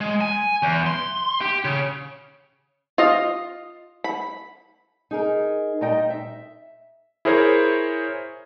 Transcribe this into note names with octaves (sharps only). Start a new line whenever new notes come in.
G#3
G#5
E2
C6
G4
C#3
F4 D#5 F5
B5
D#4 G#4 A#4
A#2 G3 D#4 D#5 G5
E5
E4 G#4 A#4 C5 C#5